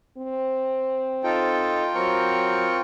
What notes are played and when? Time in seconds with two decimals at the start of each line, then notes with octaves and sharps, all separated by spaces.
0.18 C4
1.24 D#4 F4 A4 G5
1.95 F#3 C4 A#4 C#6